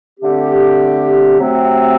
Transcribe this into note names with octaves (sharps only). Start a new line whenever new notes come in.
D3 A3 C4 G4
C3 F#3 A3 C4